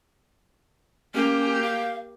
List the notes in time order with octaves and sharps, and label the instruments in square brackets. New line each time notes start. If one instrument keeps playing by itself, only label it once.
[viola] A#3 G4 [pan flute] C#4
[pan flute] F5